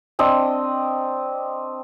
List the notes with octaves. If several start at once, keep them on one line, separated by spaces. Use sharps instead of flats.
C4 D4 D#5